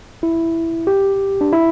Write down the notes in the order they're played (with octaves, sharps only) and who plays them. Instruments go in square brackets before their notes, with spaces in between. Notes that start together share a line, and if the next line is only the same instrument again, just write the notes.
[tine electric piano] E4
G4
D4
E4